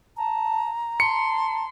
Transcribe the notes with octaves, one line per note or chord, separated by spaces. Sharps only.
A5 A#5
A5 C6 C#7